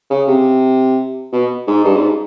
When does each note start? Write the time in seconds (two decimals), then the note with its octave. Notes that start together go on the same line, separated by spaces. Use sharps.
0.10 C#3
0.28 C3
1.33 B2
1.68 G#2
1.84 G2
1.97 G#2